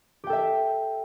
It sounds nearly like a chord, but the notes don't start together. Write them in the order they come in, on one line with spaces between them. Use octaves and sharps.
G4 G5 A4 E5